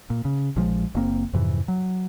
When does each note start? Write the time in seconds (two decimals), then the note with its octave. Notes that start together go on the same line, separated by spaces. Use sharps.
0.10 A#2
0.25 C#3
0.56 A#1 F3 G#3
0.95 F#1 A#3 C4
1.33 F2 G#2 C3 E3
1.68 F#3